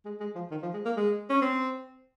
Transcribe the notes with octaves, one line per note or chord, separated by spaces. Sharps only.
G#3
G#3
F3
D#3
F3
G#3
A#3
G#3
C#4
C4